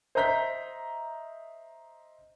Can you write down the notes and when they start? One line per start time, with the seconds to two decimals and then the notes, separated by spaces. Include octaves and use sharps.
0.15 C5 D#5 E5 A#5 G6 B6